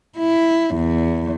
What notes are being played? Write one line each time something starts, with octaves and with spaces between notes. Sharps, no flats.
E4
E2